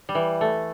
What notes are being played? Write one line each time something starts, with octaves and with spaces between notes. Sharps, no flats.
G3
E3
A3